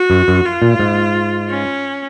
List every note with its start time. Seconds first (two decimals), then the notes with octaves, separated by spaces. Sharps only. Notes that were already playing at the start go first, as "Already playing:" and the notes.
Already playing: F#4
0.10 F#2
0.28 F#2
0.45 F4
0.62 A#2
0.79 G#2
1.49 C#4